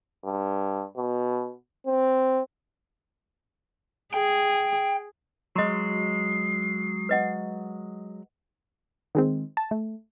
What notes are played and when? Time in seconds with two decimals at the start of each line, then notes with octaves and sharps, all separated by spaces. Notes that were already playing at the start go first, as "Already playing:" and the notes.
0.25 G2
0.97 B2
1.87 C4
4.14 G#4 G5
5.55 F#3 G#3 F#4 D#5 C7
7.09 B4 D#5 F#5
9.15 D#3 G#3 C4
9.57 A5
9.71 A3